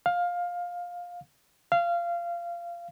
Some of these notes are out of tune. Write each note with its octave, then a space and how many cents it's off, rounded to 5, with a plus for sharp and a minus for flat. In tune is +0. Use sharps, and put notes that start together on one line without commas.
F5 +15
F5 -20